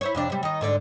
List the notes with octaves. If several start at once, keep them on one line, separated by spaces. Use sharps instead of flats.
E4 C5 C#5
F2 C3 D4
C3 G3
D#3 D#4
G#2 D3 D5